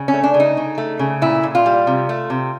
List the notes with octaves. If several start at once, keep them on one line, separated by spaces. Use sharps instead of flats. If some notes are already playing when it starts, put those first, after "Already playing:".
Already playing: C#3
C#4
A3
D4
C#3
D#4
C#3
A3
C#3
A#2 E4
A#2
F4
G3
C3
A3
C3